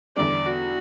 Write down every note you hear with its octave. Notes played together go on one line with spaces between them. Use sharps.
E2 D3 G3 D4 D5
F#4